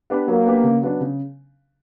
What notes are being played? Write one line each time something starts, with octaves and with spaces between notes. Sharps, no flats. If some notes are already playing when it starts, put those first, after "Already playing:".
B3 D4 G4 B4
F#3 A#3
B3 D4 G4 B4
C#3
F#3 B3 D4
C#3